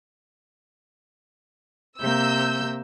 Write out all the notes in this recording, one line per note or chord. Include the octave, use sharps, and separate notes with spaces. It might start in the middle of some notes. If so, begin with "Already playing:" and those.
C3 A#3 E6 G6